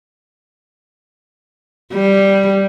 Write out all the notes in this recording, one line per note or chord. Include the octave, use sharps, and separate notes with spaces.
G3